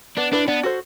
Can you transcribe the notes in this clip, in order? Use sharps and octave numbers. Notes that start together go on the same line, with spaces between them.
B3 D4
D4 E4 B4
B3 D4
F#4 A4 C5